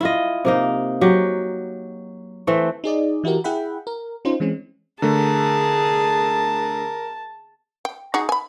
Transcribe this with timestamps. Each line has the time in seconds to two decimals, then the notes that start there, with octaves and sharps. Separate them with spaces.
0.01 E4 F4 D#5
0.45 C3 A#3 D#4
1.01 F#3 G4
2.47 E3 A3 C4
2.84 D#4 G#4 D5 D#5
3.24 E3 E4 F#4 G4 A#4
3.44 E4 G#4 E5 F#5 G5 B5
3.87 A#4
4.25 C#4 D#4 F4 C5
4.40 E3 G#3 C4 C#4
5.02 D3 A3 G#4 A#4 A5
7.85 G5
8.14 D#4 F#4 G#4
8.29 G#5 B5